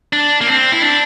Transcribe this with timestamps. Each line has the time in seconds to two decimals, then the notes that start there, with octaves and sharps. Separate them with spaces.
0.13 D4
0.41 A#3
0.47 C4
0.72 E4
0.82 D4